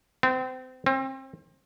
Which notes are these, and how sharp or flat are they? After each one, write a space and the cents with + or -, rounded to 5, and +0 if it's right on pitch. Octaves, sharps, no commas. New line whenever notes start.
C4 -30
C4 +30